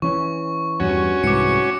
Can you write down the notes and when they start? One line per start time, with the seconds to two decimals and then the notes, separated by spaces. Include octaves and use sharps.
0.02 E3 C#4 C#6
0.80 E2 G2 C#4 F#4
1.23 C2 G#2 E3 D6 C#7